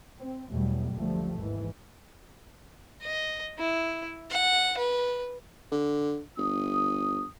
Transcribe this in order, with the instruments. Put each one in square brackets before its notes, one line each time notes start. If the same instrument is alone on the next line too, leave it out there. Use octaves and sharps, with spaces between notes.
[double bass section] C4
E2 B2 F#3 G3 A3
F#1 D2 F3 G3 A3
G#1 D#2 G#2 E3
[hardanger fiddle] D#5
E4
F#5
B4
[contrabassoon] D3
[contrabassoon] G1 [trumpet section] D#6